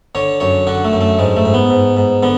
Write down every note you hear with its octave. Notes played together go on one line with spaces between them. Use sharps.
D3 C#5
F#2 C#5
D3 F#4
A3
F#2
A3
G#2 G#3
A3
G#2
B3
G#2
G#2
D3 B3